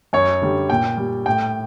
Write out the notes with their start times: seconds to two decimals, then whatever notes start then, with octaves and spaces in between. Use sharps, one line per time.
0.13 F#2 C#5
0.42 D3 G3
0.70 A#2 G5
0.98 G3
1.26 A2 G5